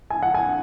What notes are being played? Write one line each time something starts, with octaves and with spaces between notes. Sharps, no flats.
G#5
F#5
G#5